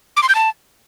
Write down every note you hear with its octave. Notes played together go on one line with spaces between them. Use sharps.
D6
C6
G6
A5